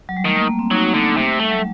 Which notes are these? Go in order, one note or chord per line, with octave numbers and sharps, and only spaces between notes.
F#3
G3
D#3 A3
A#3
A#3
C4
F#3 D#4
D3
C3 A3
G3 A3
F#3